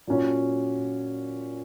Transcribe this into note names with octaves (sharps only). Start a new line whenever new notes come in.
A#2 F#3 C#4 F#4